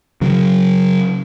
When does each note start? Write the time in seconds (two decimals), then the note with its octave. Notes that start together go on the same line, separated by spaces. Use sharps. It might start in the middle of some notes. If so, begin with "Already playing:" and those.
0.21 C#3 F#3